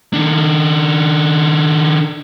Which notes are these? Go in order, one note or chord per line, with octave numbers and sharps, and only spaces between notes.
D#3 D4